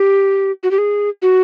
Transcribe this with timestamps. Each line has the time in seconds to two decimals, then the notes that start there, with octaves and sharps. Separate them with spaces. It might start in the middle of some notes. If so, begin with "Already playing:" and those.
Already playing: G4
0.63 F#4
0.71 G4
0.78 G#4
1.22 F#4